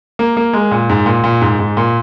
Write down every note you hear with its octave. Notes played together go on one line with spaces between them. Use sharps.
A#3
A#3
G#3
A#2
G#2
A#2
A#2
G#2
G#2
A#2